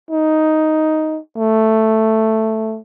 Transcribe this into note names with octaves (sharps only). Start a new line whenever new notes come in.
D#4
A3